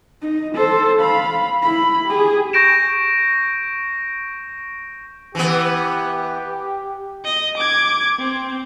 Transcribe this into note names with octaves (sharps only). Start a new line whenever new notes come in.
D#4
A4 C5
F5 B5
E4 B5
G4 G#4
C#6 G6 A#6 D7 E7
E3 B3 G4
D#5
D6 G#6
C4